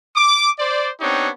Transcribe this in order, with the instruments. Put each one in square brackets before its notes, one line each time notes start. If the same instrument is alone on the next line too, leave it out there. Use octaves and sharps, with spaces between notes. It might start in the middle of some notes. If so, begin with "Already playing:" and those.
[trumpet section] D6
C5 D5
B3 C4 D4 D#4 G4 C#5